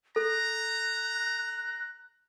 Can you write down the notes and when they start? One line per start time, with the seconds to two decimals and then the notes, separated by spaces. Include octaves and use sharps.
0.16 A4 A#5 F#6